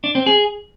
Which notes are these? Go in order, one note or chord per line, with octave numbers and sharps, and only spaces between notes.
D4
C4
G#4